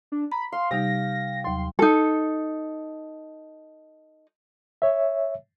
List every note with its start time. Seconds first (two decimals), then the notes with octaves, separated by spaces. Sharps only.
0.12 D4
0.32 A#5 B5
0.52 F5 C6
0.71 C3 G3 D#4 G4 G5 A#6
1.44 D#2 F#3 C6
1.79 D#4 A4
4.82 C#5 E5